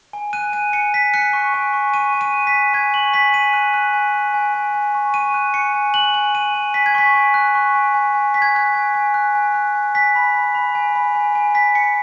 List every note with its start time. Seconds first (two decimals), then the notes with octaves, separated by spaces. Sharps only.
0.13 G#5
0.33 F#6 D#7
0.53 G#5 D#7
0.73 G#5 C#7
0.94 G#5 B6
1.14 F#6 C#7
1.33 C#6
1.54 G#5
1.73 C#6
1.94 C#6 D#7
2.14 G#5
2.21 D#7
2.34 F#6
2.47 B6
2.54 G#5
2.74 G#5 G#6
2.94 C#6 F#7
3.14 G#5 B6
3.34 G#5 D#7
3.54 F#6
3.74 F#6
3.93 G#5
4.14 F#6
4.34 G#5
4.54 G#5
4.74 G#5
4.95 C#6
5.14 C#6 D#7
5.34 F#6
5.54 G#5 C#7
5.74 G#5
5.94 F#6 F#7
6.14 G#5 F#7
6.35 G#5 D#7
6.54 G#5
6.74 G#5 B6
6.86 G#6
6.94 C#6 B6
7.15 G#5
7.34 F#6
7.55 C#6
7.75 G#5
7.94 G#5
8.15 G#5
8.34 G#5 B6
8.42 G#6
8.55 F#6 G#6
8.75 G#5
8.94 G#5
9.14 F#6
9.35 G#5
9.54 F#6
9.75 G#5
9.95 G#5 B6
10.15 B5
10.34 B5
10.55 B5
10.75 G#5
10.95 B5
11.15 G#5
11.35 G#5
11.55 G#5 B6
11.75 G#5 C#7